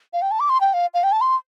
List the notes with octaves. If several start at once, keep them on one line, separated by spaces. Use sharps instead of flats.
F5
G5
A5
D6
C6
G5
F5
F5
G5
A5
C6